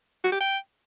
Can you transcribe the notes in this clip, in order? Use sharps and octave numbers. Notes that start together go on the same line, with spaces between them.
F#4
G4
G5